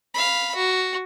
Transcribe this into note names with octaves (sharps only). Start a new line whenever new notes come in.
F5 B5
F#4